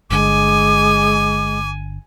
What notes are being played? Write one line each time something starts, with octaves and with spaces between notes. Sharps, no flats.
G1 D3 G#3 G#5 D6